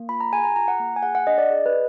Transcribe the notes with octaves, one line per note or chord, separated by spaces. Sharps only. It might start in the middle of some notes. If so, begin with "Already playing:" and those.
Already playing: A#3
F4 B5
A#5
G#4 G#5
A#5
F4 A#5
F#5
A#3
G#5
G#4 F#5
F#5
D4 D#5
D5
G#4 D#5
B4